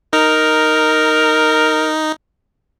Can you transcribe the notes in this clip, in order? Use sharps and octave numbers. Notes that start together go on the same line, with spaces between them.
D#4 A#4